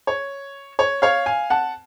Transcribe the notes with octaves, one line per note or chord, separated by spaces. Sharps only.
C#5
C#5
C#5 F5
F5 G#5
F#5 A5